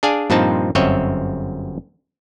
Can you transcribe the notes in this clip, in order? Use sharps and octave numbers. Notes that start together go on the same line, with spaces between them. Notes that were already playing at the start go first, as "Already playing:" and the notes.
D4 G#4 D5 F5 G#5
G2 A#2 F3 C4 D#4 A5
G1 F#2 C4 C#5 D#5 E5